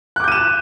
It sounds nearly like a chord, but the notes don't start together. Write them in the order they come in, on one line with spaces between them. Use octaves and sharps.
F#6 D6 G6 D#7 E7